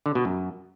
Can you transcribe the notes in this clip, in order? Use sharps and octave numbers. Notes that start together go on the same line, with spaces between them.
D3
B2
F#2